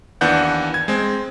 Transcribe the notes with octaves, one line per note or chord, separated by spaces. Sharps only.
D#2 E3 B3 D4 F#5 G6
G#6
G#3 C4